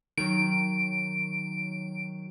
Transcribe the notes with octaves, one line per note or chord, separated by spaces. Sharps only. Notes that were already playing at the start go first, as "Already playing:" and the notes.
D#3 F#3 D7